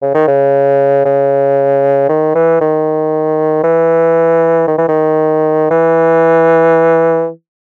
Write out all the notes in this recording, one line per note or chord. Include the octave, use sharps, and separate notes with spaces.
C#3
D#3
C#3
C#3
D#3
E3
D#3
E3
D#3
E3
D#3
E3